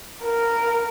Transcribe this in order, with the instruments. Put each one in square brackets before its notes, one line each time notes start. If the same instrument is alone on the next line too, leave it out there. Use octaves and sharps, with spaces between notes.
[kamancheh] A#4